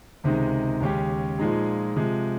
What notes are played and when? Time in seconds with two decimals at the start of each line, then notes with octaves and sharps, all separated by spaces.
0.24 C#2 C3 D#3 G#3 D#4
0.81 D#2 C#3 G#3 C#4 G4
1.38 A#2 F3 G#3 D#4 G#4
1.96 C3 F3 G#3